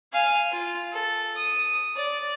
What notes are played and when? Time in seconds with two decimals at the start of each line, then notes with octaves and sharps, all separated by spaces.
0.13 F5 G#5
0.52 F4
0.93 A4
1.36 D#6
1.97 D5